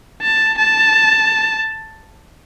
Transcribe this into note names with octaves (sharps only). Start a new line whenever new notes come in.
A5
A5